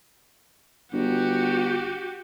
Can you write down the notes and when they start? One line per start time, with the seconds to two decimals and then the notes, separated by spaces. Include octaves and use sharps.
0.93 G1 F#4 G4